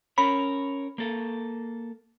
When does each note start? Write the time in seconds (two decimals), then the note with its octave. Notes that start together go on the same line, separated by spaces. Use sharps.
0.18 C#4 A#4 C#5 B5
0.98 A#3 A4